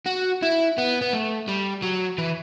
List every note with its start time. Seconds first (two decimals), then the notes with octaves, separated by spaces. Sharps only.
0.06 F#4
0.42 E4
0.78 B3
1.01 B3
1.13 A3
1.48 G3
1.82 F#3
2.18 E3